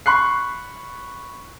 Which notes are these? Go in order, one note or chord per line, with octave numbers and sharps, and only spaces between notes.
B5 C#6 F#6 C7